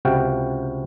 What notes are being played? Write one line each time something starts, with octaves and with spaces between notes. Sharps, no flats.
C#2 C3 F#4 F5 G5